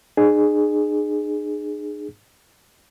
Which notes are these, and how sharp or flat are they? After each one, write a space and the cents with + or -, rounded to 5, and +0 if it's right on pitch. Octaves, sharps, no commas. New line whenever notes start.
D#4 -45 G#4 +0